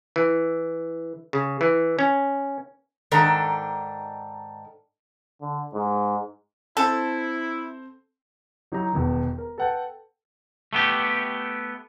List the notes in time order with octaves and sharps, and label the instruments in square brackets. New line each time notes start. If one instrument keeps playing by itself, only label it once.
[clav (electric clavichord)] E3
C#3
E3
C#4
[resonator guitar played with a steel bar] G#2 D#3 D4 A4 A#5
[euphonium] D3
G#2
[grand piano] C4 C5 [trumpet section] E4 [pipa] A4
[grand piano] F#3 D#4 E4 G4 A#5
E1 E2 D#3
A#4
A4 B4 F#5 G5 A5
[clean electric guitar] A3 B3 G4